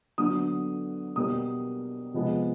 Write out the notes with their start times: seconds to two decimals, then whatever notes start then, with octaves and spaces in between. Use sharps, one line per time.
0.18 D3 F#3 B3 D#6
1.16 B2 G3 A#3 D#6
2.14 C3 F3 G#3 B3